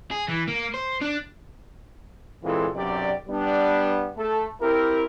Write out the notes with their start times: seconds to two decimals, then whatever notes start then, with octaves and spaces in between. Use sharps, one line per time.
0.11 G#4
0.28 E3
0.48 A#3
0.74 C5
1.01 D4
2.44 A#2 E3 G#3 C4 F4 A4
2.76 B1 F#2 C3 G4 D5
3.29 G3 B3 D4
4.17 A3 A4
4.62 C4 E4 G4 A#4